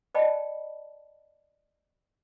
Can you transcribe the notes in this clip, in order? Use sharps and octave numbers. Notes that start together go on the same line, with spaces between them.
C5 D5 D#5 G5 A5 B5